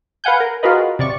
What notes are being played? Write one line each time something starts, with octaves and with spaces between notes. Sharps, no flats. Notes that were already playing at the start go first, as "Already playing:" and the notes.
B4 F5 F#5 G#5 G6
A#4
F4 F#4 G#4 A#4 B4 D#5
C3 D5 C#6